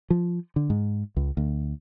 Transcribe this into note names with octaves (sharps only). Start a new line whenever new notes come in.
F3
D3
G#2
C#2
D2